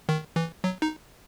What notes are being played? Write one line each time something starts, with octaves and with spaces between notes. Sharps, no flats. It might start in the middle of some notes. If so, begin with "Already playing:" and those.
D#3
E3
F#3
D#4